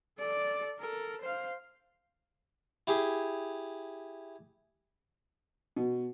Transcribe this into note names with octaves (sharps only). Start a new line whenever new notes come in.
A4 D5
A4 A#4
C5 F5
E4 G4 G#4
B2